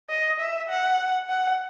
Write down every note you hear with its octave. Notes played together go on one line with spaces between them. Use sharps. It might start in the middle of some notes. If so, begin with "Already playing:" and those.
D#5
E5
F#5
F#5